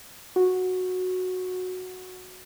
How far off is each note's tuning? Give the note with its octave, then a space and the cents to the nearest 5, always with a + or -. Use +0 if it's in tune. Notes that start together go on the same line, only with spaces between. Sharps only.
F#4 -10